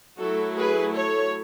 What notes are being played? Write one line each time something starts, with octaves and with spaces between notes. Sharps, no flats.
F#3 A3 E4 F#4 A4
G#4 B4
A4 C#5